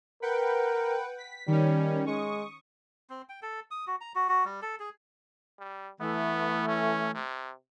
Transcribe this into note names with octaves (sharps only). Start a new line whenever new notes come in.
A#4 B4 F#5 G5
B6
D#3 G3 C#4
G#3 C#6 D#6
C4
G5
A4
D#6
F#4
A#5
F#4
F#4
G3
A4
G#4
G3
E3 A3 B3
C#4
C3